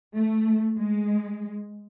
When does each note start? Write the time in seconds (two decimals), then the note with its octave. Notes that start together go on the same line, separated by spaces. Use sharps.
0.16 A3
0.79 G#3